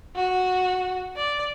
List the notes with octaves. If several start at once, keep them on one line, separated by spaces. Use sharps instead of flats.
F#4
D5